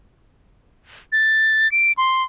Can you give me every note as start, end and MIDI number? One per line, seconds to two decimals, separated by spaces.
1.12 1.70 93
1.72 1.92 98
1.98 2.23 84